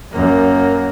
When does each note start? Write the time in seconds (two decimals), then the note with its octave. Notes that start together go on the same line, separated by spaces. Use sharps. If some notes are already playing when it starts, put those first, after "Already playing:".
0.12 F#2 A#3